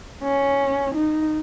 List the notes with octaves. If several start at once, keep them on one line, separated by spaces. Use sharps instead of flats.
C#4
D#4